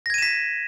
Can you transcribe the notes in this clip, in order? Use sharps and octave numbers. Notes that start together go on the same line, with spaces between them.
G#6 A#6 B6 D#7 E7